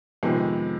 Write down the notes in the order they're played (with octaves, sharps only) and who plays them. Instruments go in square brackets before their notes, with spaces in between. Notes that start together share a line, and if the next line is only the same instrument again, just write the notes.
[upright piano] F2 C3 D#3 G#3 B3